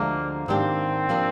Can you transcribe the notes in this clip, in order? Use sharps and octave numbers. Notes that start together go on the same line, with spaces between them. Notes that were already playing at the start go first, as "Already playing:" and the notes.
Already playing: D2 D3 F3 G#3 A#3 D4
G#2 D#3 A#3 C4 D4 G4
F3 A#3 D4